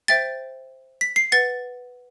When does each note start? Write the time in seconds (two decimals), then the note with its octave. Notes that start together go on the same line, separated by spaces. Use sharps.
0.08 C5 E5 G5 A6
1.01 B6
1.16 C7
1.32 B4 F#5 A6